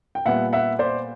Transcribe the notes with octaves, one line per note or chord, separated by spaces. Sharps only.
G5
A#2 G3 B3 E5 F#5
E5 F#5
C5 D5